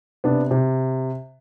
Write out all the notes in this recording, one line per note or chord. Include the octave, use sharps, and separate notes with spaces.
C3 B3 D4
C3